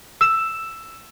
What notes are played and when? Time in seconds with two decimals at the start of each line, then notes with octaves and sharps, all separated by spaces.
0.21 E6 E7